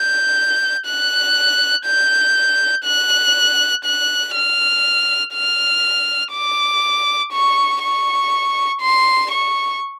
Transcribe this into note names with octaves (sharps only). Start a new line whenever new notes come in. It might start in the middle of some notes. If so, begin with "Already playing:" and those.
Already playing: G6
F#6
G6
F#6
F#6
F6
F6
D6
C#6
C#6
C6
C#6